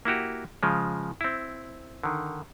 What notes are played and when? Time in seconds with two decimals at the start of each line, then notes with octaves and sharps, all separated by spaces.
0.05 A#3 E4 F#4 G4
0.63 C#3 F3 G#3
1.21 C4 E4
2.03 D3 D#3